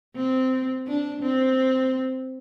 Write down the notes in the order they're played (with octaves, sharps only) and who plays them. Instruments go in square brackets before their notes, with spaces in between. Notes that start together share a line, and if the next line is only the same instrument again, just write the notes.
[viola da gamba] C4
D4
C4